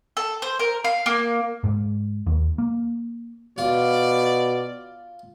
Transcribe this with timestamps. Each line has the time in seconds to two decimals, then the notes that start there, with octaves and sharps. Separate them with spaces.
0.17 A4
0.42 C5
0.59 A#4
0.84 F5
1.06 A#3
1.64 G#2
2.27 D#2
2.58 A#3
3.58 B2 F4 D5